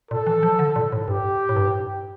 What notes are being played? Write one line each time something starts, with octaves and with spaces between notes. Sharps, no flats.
A#2 A4
E3
F3
D3
A#2
A2
G2 G4
A2
G2